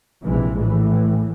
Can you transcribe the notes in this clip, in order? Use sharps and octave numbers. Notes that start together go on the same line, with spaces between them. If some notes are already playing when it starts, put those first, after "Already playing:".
A#1 C3 E3 G#3
A2 E3